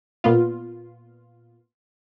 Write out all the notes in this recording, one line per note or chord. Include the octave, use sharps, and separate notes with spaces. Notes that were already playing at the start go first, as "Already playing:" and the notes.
A#2 B3 F4